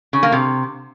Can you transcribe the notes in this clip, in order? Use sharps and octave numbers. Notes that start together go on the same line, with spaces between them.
C#3
A#3
C3